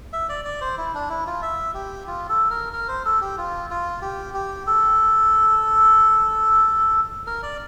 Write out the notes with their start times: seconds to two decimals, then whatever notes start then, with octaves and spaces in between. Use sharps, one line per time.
0.13 E5
0.29 D5
0.45 D5
0.61 C5
0.78 E4
0.95 D4
1.10 E4
1.27 F4
1.42 E5
1.74 G4
2.07 F4
2.29 A4
2.50 A#4
2.73 A#4
2.88 C5
3.05 A4
3.21 G4
3.38 F4
3.70 F4
4.02 G4
4.34 G4
4.67 A4
7.27 A#4
7.43 D5